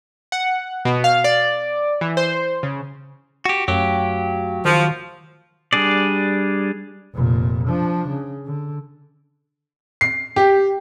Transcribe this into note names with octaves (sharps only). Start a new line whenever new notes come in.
F#5
B2
F5
D5
E3
C5
C#3
F#4 G4
F#2 F#3 A3 G4 F5 G5
D#3 F3
G3 D4 G#4 D5
F1 A#2
F3 D4
C#3
D3
C7
G4